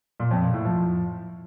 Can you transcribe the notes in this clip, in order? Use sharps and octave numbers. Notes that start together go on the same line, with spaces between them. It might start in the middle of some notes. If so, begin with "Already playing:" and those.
A#2
F2
A#2
A2
F3